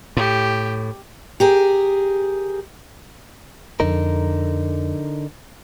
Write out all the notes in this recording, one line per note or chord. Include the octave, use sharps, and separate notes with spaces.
A2 G4
G4 G#4 A#4
F2 D3 D#4 A#4